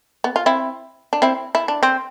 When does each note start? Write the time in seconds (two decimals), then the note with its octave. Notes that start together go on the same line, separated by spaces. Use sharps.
0.24 B3
0.36 F4
0.46 C4 E4
1.13 D4
1.22 C4 E4
1.55 E4
1.68 D4
1.83 C4